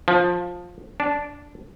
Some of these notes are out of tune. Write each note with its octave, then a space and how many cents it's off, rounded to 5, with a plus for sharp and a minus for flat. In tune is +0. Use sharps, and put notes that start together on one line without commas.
F3 +15
D4 -10